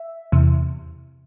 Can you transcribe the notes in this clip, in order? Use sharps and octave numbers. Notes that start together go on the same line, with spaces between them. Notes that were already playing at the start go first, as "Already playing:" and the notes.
Already playing: E5
E2 C3 E3